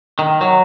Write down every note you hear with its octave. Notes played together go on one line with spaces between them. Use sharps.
D#3
F#3